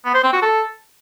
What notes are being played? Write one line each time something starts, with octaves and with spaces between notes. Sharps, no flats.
B3
C5
C4
F#4
A4